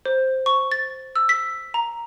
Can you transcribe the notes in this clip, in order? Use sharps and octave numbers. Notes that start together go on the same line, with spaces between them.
C5
C#6
A6
E6
B6
A#5